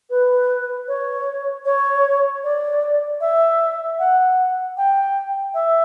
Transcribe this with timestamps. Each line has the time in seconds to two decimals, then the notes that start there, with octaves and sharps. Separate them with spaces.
0.10 B4
0.88 C#5
1.65 C#5
2.44 D5
3.21 E5
3.99 F#5
4.77 G5
5.54 E5